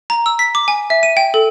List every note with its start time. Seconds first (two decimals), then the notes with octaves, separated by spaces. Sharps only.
0.10 A#5
0.26 E6
0.39 B6
0.55 D6
0.68 G#5
0.90 E5
1.03 D#7
1.17 G5
1.34 A4